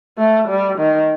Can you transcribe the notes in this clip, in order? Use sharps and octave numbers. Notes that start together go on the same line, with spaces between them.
A3
G3
D#3